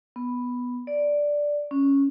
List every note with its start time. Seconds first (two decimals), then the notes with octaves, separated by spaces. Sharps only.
0.16 B3
0.87 D5
1.71 C#4